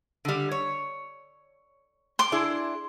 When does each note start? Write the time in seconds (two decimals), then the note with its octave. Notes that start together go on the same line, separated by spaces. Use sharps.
0.25 D3 G3
0.51 C#5
2.19 C6 D6
2.32 D4 E4 G#4